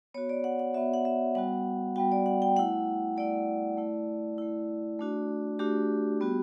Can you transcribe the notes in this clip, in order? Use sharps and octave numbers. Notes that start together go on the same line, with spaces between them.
B3 F#4 C#5
D5
F#5
F#5
B3 F#4 E5
F#5
E5
G3 B3 F#4 F#5
G3 B3 F#4 G5
D5
F#5
G5
A3 E4 F#5
A3 E4 D5
A3 E4
A3 E4
A3 D4 F#4
A3 D4 F#4 G4
G3 B3 F#4